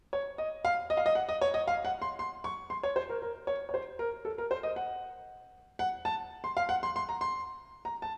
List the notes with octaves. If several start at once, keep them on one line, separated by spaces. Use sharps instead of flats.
C#5
D#5
F5
D#5
F5
D#5
F#5
D#5
C#5
D#5
F5
F#5
C6
C6
C#6
C6
C#5
C5
A#4
A#4
C#5
C#5
C5
A#4
A4
A#4
C5
D#5
F#5
F#5
A5
C6
F5
F#5
C6
C6
A#5
C6
A#5
A5